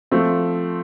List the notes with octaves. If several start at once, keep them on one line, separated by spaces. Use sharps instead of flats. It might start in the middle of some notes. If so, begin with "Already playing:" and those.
F3 A3 C4